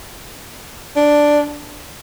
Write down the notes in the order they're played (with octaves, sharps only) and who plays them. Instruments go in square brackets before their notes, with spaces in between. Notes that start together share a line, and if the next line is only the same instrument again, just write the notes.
[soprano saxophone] D4